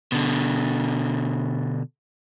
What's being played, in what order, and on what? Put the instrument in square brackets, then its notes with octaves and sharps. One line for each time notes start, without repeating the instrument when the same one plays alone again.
[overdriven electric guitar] B2 D3